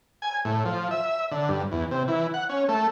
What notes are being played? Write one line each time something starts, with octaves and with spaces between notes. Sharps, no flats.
G#5
A2
F3
E5
D3
G2
E2
C3
E3
F#5
C#4
A3